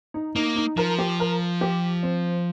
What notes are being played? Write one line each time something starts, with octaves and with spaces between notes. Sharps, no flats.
D#4
A#3 D#4
D#4
F3 A#4
G4
A#4
G4
C4